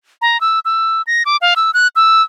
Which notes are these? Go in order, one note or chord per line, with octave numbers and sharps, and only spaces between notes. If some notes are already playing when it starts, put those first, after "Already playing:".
A#5
E6
E6
A#6
D6
F5
E6
F#6
E6